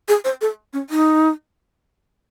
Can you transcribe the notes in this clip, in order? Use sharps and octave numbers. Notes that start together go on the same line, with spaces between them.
G#4
C5
A4
C#4
D#4